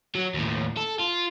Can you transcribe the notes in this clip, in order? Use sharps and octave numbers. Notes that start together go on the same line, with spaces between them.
F#3
D#2 A2
A4
F4